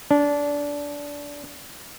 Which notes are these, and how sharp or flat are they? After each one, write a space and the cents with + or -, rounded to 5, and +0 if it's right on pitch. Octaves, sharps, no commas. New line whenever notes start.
D4 -20